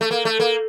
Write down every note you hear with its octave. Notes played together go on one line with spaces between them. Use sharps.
A3
A#3
A3
A#3